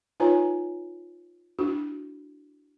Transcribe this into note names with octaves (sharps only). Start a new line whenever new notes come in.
D#4 F4 B4 C#5 G#5 A#5
D4 E4 F#4